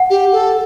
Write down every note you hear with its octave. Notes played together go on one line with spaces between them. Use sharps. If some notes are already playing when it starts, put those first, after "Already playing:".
Already playing: F#5
G4
A4